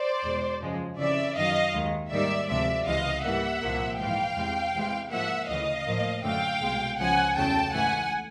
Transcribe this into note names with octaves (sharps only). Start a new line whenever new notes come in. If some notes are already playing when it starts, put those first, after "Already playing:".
Already playing: C5 D5
E2 B2 G#3
F#2 C#3 F3 G#3
F2 C#3 E3 D5 E5
F#2 D#3 F#3 D#5 F5
D#2 D#3 G#3
G#2 D#3 G3 A#3 D5 E5
D2 C3 F3 G#3 D5 E5
C#2 C3 E3 G#3 D#5 F5
G#2 E3 G3 A#3 E5 F#5
C2 A#2 F3 A#3
G#2 E3 G#3 F5 G5
E2 C3 E3 G#3
E2 C3 E3 G#3
G#2 F3 A#3 E5 F#5
D2 C#3 E3 D#5 F5
A2 F3 A#3
F#2 D3 F#3 A3 F5 G5
C2 B2 G#3
C#2 C#3 F3 G#3 F#5 G#5
E2 C#3 F#3 A3 G5 A5
G#2 E3 A3 F#5 G#5